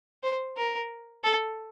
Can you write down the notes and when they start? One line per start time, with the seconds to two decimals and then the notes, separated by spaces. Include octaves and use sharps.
0.23 C5
0.57 A#4
1.24 A4